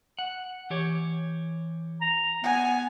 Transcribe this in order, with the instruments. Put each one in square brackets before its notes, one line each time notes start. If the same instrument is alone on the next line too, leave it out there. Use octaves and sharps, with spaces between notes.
[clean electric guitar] F#5
E3 G4 C#5
[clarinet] A#5
[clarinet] B3 [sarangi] G#5